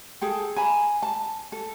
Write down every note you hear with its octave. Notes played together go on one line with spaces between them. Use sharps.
G#4 A4 G5
G#5 A#5 B5
A5
A4